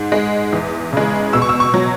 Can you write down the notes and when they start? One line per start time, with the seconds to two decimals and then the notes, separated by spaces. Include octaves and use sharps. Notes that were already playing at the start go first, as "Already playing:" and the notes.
Already playing: G#2
0.12 G#3
0.53 E2
0.93 C#3 G#3
1.33 B2 E6
1.42 C#6
1.49 E6
1.60 C#6
1.74 F#3